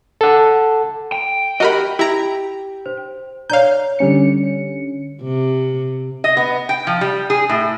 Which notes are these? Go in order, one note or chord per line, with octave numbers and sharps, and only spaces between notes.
A4 F#5
G5
F#4 G4 A#4 D#5 B5
E4 G4 A#5
C5
C#5 D5 F5 A#5 G6
D3 G3 C#4 C#7
C3
D#5
B3
G5
F3
G3
G#4
A2